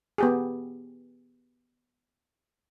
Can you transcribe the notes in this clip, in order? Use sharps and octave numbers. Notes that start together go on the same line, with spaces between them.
B3 G4 G#4